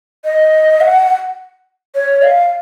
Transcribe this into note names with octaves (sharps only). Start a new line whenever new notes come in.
D#5
F#5
C#5
F5